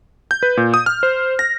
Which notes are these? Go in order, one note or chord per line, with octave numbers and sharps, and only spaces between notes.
G6
B4
A#2
D#6
F6
C5
A#6